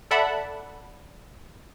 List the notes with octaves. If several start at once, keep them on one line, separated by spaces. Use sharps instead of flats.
A4 D5 E5 F#5 A5 B5